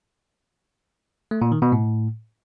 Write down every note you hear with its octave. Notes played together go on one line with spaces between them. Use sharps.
A3
A#2
D#3
B2
A2